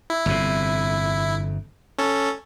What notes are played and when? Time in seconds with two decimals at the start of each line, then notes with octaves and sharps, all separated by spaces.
0.10 E4
0.26 G1 F2 C3
1.98 C#4 A4